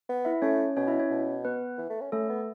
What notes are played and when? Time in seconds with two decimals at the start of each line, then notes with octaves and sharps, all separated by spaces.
0.09 B3
0.25 E4 E5
0.42 A3 C#4 C#5
0.77 B2 C#4 C#5
0.87 E4 E5
0.99 C#4 C#5
1.11 B2
1.45 B3 B4
1.78 E3
1.90 A3
2.01 C#4
2.12 A3 C#4 A4
2.30 B3